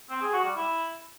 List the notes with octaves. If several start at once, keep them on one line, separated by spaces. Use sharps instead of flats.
C4
G#4
F#4
G3
E4